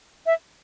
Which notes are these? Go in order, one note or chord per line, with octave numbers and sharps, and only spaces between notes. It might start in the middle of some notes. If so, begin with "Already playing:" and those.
E5